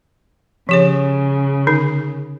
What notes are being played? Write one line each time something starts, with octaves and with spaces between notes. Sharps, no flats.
C#3 F3 G4 C#5
D3 D#4